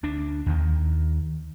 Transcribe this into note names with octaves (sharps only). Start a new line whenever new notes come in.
D2 D4
D#2 D#3